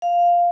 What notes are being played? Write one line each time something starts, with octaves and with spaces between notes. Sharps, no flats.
F5